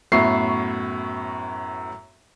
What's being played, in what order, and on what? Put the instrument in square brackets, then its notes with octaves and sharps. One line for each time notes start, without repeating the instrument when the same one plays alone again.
[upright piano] F#2 A2 B3 E5 C#6 C7